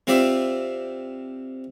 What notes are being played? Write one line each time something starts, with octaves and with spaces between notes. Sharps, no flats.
C3 C4 F4 C5 D5 E5